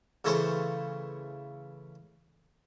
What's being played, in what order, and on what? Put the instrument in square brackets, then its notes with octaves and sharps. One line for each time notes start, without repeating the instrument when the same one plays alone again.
[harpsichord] C#3 E3 A3 A4 C5 C#5